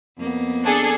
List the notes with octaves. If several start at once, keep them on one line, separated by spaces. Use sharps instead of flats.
F2 A#3 B3
D4 G#4 A4